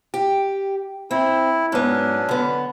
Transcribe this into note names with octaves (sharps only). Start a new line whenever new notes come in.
G4
C4 E4
G#2 F#3 B3 C#4 D4
D3 B3